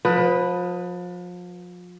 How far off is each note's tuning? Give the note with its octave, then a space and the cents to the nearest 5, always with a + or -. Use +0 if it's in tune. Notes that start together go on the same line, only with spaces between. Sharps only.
F3 +35 B4 +0